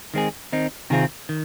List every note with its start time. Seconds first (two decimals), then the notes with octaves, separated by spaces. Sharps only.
0.14 D#3 G#3 C4 G#4
0.53 D#3 C4 D#4
0.90 C3 D#3 C4 F4 G#4
1.29 D#3